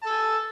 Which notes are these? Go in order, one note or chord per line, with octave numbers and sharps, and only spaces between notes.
A4 G#5 A5